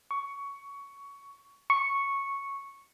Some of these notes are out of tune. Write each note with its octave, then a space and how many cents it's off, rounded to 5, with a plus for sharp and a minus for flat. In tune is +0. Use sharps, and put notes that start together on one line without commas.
C#6 +15
C#6 -5